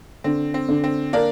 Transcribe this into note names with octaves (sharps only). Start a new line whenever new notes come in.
D3 C4
C4
D3
C4
A#3 D4 A#4